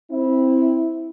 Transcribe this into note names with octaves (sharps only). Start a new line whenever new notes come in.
C4 E4